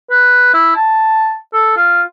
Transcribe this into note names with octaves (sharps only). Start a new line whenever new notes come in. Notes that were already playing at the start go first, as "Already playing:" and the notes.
B4
E4
A5
A4
F4